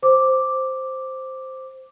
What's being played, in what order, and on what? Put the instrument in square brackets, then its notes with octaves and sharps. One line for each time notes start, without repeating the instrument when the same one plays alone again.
[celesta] C5 D6